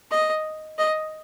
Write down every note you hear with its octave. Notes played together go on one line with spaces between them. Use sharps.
D#5
D#5